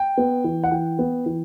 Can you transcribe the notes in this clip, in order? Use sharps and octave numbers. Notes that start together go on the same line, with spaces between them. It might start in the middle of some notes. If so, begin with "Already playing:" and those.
Already playing: G5
B3
E3
F#5
E3 G5
B3
E3